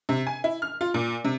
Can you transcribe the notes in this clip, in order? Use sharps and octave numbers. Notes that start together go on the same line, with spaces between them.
C3
G#5
E4
F6
F4
A#2
C3